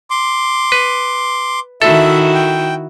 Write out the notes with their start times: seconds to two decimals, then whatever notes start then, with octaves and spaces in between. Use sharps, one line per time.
0.10 C6 D6
0.72 B4
1.82 D#3 E4 F#4 A4 E5
2.34 G5